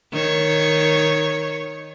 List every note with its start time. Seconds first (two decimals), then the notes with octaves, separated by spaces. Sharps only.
0.12 D#3 C#5